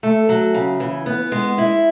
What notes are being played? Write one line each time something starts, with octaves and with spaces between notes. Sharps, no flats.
A3
F#3
C#3
E3
B3
G#3
E4